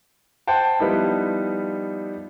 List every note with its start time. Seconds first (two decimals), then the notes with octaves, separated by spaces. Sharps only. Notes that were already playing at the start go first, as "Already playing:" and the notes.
0.47 C5 F#5 G5 A5
0.79 F3 G3 B3 D#4 E4